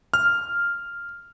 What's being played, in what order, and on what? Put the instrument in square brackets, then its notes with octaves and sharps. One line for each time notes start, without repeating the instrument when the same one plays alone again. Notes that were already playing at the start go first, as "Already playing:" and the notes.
[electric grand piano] F6